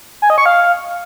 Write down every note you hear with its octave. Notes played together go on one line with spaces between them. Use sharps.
G#5
D#5
C#6
F5